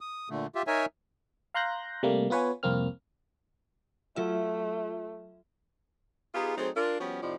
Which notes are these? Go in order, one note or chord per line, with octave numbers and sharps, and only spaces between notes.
D#6
A#2 D3 A3
F4 G4 E5
D#4 A#4 C#5 E5 G#5
F5 A#5 C6 F#6 G6 A#6
C3 G3 A3 A#3
B3 F4 B4 C#5 G#5
C2 F2 A#3 C4 F6
F#3 A3 F4 E5
B3 D#4 F4 G4 G#4
F#3 A3 C4 D#4 G#4 C5
D4 F4 A#4
F3 G3 B3 C#4 F#4
F2 A2 C3 F3 D#4 D5